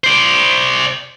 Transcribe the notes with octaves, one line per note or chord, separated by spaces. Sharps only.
C5 D5